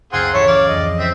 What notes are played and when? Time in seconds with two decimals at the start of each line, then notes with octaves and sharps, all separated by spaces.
0.13 F#1 C#2 C4 F4 G#4 F#5 C6
0.34 A2 C#3 E3 E4 A4 C#5
0.48 D5 F5
0.68 F2 D#5
0.85 C4
0.99 C4 C#4 E5 A#6